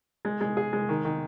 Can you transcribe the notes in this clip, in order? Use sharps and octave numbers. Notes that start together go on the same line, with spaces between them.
G#3
G#3
G#4
G#3
D#3
D#3